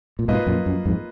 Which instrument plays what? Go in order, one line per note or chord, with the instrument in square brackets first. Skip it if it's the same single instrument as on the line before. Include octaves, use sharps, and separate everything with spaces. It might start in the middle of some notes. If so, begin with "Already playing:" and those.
[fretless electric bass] A#2
[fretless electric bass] G#2 B2 [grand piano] A#3 F4 B4 D#5
[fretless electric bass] F#2 A#2
F#2
F2 G#2